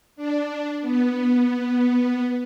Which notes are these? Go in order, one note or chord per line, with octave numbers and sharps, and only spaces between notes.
D4
B3